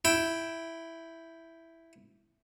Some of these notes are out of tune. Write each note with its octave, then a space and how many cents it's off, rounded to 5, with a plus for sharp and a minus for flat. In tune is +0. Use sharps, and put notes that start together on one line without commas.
E4 +0 G5 +0